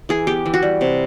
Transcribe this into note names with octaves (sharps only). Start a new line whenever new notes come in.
E3 G#4
B3 G4
E3
F#4
G3
C3